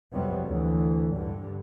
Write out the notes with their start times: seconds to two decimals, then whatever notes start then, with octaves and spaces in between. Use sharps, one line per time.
0.13 C2 F2 C3 F#3 G3 B3
0.46 D2 E3
1.15 G2 D3